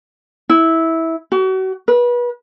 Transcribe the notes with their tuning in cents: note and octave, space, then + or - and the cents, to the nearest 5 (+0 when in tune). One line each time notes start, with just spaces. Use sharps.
E4 -15
F#4 +35
B4 -30